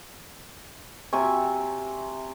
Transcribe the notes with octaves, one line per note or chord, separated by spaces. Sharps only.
C3 E5 G#5 C#6